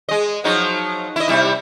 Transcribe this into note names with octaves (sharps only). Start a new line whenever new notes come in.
G#3 D#5
F3 F#3 D#4
E4 D#5
C3 G3 E4